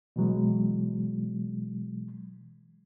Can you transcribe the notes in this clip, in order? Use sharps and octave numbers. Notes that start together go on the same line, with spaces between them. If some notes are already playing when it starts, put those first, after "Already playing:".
B2 E3 F#3 G#3